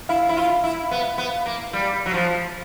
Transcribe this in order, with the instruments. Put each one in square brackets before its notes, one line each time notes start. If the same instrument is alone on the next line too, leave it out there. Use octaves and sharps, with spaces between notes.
[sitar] E4 [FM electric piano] F5
[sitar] E4
F4
E4
B3
B3
A#3
G3
F#3
F3